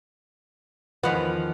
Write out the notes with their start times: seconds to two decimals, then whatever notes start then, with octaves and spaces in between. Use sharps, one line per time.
1.03 E2 D#3 F3 F4 B4 F#5